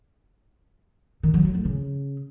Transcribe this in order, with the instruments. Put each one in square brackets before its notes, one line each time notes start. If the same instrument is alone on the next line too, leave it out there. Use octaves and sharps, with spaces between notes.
[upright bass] D#3
F#3
F#3
A3
C#3